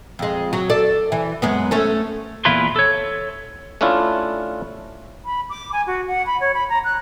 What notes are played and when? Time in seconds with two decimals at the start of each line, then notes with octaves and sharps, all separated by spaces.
0.19 F2 G#3
0.53 F#3
0.70 A4 D5
1.12 E3
1.42 F#2 G#3 B3
1.71 A3 C#4 A4
2.45 E2 A#2 E4 F4 B4 C6
2.76 A4 C#5
3.81 A3 C#4 D4 E4 F4
5.25 B5
5.49 D6
5.72 G#5
5.87 F#4
6.07 F#5
6.26 B5
6.40 C#5
6.54 B5
6.69 A#5
6.84 F#6